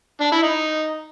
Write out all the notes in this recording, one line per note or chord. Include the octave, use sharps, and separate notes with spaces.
D4
E4
D#4